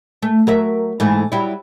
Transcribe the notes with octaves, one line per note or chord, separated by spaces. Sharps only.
A3
F#3 A#4 E5
G#2 E3 A3
F#3 G3 E4